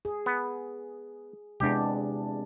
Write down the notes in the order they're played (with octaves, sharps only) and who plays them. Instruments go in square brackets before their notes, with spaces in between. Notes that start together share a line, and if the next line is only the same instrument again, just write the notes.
[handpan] G#4
[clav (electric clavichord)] B3
[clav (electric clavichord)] E2 G4 [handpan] C3 G#3 D4